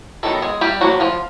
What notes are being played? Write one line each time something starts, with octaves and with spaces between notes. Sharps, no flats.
D#3 F#3 B3 D#4 A4
G#3 G#4
G3 G4
F3 F#3 A#3 D4 F#4
F3 F4